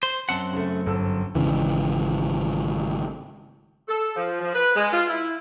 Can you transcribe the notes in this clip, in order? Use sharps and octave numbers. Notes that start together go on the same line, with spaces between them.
C5
F#2 C4 F#5 A5
C#3 A3
G1 A4 E6
G#1 D#2 C#3 E3
A4
F3
F3
B4
G#3
F4
E4